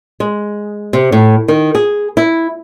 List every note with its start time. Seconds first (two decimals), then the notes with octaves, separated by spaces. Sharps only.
0.20 G#3
0.93 C3
1.12 A2
1.48 D#3
1.75 G#4
2.17 E4